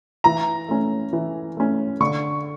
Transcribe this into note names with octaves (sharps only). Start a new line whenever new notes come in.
E3 A#5
A3 C#4
E3
A3 C#4
D3 C#6